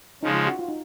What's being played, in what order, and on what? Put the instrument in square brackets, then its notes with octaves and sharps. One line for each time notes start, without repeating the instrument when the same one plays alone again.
[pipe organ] C#3 F3 G#3 [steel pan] D#4
[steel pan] F4
F#4
F4
D#4